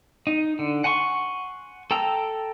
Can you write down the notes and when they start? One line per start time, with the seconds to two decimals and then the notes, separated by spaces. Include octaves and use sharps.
0.27 D#4
0.59 D3
0.84 F#5 G#5 C6 C#6
1.91 A4 G5 A#5 E6